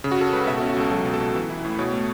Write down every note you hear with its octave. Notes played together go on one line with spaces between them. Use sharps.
C#3
F#4
C#4 A4
C#2 B4
B2 E5
F#4
A4
C#4
F#4
C#2 A4
F#3 A4
B2
A4
B2
E3
E4
A2
B2 C#5
A3